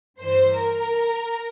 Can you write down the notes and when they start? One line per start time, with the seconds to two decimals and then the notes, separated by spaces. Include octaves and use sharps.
0.19 G2 E3 C5
0.54 A#4